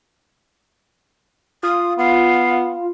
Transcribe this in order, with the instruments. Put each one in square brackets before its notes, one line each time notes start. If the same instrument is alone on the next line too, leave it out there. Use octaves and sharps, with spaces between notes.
[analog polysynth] F4 [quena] D#6
[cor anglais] B3 [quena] F5